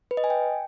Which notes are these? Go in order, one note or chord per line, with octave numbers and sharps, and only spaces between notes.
B4
D#5
G#5
G5